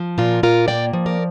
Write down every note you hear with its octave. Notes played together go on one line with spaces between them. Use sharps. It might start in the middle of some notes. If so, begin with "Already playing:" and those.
Already playing: F3
A#2 F4 A#4
A#2 F4 A#4
A#3 D5 G5
F3
A#4 D5